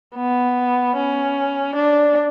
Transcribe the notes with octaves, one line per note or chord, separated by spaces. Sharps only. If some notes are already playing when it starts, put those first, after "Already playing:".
B3
C#4
D4